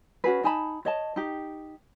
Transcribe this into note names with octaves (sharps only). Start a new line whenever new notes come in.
C#4 F#4 G#4 B4
D#4 G#5 A5 B5
C#5 D#5 A5
D#4 G4